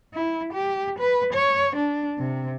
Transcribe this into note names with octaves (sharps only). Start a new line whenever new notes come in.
E4
G4
B4
C#5
D4
C3